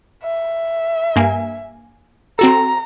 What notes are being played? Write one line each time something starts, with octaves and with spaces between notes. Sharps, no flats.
E5
G2 A#3 G#5
C4 F#4 A4 A#5